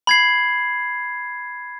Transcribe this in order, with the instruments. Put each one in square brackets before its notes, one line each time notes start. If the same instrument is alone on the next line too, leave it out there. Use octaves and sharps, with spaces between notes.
[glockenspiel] B5 G#6 C7